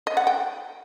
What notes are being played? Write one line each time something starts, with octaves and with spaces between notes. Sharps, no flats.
D#5
F#5
G5